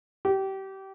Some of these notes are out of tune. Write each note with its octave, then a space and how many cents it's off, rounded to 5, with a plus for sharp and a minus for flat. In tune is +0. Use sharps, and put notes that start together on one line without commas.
G4 -25